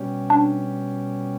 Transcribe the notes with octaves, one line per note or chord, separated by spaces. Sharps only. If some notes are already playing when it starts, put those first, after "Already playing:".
Already playing: B2 G3 C#4 G4
D4